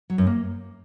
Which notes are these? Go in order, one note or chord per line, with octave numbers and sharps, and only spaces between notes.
F#3
F#2
A#3